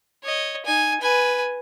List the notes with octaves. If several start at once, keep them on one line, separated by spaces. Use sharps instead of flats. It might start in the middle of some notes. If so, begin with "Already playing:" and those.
C#5 D#5
D#4 G#5
B4 G#5